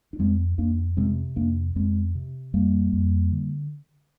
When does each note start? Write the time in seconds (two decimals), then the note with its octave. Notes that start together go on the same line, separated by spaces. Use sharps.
0.13 D4
0.19 F2 G#3 C4
0.58 F2 A#3 D4
0.97 C3 G#3 C4
1.36 F2 A#3 D4
1.75 F2 G#3 C4
2.15 C3
2.53 F2 G3 A#3
2.93 F2
3.32 D3